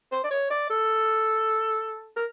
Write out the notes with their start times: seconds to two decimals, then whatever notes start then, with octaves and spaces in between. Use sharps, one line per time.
0.12 C5
0.24 D5
0.31 C#5
0.50 D5
0.70 A4
2.17 A#4